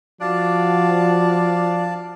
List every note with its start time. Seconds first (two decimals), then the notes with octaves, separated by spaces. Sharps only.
0.21 F3 D4 F#4 D5 F5 A5